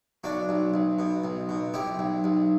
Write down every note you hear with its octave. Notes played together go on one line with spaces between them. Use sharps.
B1 D4 F#4
B1
B1
B2
B1
B2
B1 E4 G4
B1
B1